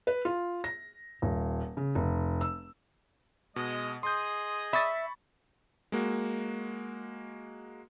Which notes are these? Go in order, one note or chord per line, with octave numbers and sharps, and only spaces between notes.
B4
F4
A#6
D#1
C#3
F1
E6
B2 G#3 D#5
G#4 D#5 C6 D#6 G6
E5 B5 C#6 A6
G#3 A#3 F#4